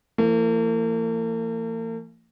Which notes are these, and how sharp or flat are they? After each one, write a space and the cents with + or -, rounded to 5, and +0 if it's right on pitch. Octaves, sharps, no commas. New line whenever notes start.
E3 +35 A#3 -45